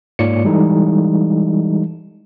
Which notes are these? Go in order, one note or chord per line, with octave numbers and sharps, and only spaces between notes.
G#2 A#3 F4 C#5 D5 C#7
E3 G3 G#3 D#4 E4 A4